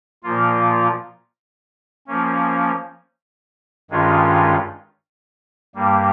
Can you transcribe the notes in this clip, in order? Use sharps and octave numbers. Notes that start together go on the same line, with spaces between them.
A#2 F3 A#3 F4
F3 A#3 C#4
G2 D#3 G#3 C#4 F4
G2 G3 A#3